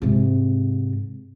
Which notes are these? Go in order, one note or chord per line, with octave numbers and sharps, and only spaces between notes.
G#2 C3